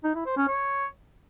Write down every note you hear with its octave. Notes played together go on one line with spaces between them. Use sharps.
D#4
E4
C5
C#4
C#5